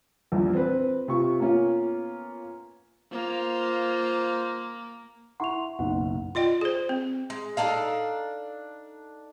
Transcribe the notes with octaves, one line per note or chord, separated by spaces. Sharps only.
A#1 E2 G2
C4 B4
C3 F4 C#6
A#3 B3 C#4 F4
A#3 F4 C5
E4 E5 F#5 C6 C#6 F7
F#1 B1 D#4 F#5
F4 D5 D#5 G5
G#4 C5
C4
G#3
D4 D#4 A4 F5